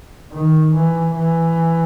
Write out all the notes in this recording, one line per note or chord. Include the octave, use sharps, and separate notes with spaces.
D#3
E3
E3